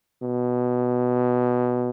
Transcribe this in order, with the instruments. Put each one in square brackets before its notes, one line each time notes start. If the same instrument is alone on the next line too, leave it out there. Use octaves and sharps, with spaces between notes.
[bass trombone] B2